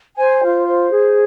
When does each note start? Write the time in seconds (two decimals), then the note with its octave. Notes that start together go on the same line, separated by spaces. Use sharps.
0.15 C5 G#5
0.41 F4
0.66 C5
0.90 G#4